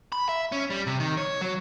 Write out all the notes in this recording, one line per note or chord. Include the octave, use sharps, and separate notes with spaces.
B5
E5
C#4
G3
C3
D#3
C#5
F#3